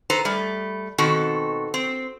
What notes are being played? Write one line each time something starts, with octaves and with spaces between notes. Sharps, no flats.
A4 B4 C5 A#5
G3 A3
B2 D#3 C4 F#4 A4
C4